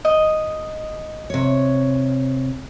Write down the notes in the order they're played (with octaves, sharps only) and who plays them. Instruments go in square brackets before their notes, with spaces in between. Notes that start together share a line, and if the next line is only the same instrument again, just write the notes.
[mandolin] D#5
[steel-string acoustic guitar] C3 C#5